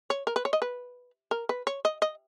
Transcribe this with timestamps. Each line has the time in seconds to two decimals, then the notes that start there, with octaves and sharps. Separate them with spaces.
0.10 C#5
0.27 A#4
0.36 B4
0.45 C#5
0.53 D#5
0.62 B4
1.31 A#4
1.49 B4
1.67 C#5
1.85 D#5
2.02 D#5